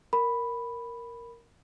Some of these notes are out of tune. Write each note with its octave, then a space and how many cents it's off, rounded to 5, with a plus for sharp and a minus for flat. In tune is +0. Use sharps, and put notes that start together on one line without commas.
A#4 +0 B5 +0